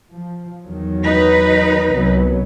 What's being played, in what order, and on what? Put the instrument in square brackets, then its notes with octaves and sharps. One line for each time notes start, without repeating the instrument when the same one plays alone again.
[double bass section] F3
E2 D#3 F#3
[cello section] D#4 B4
[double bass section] C2 F#3 B3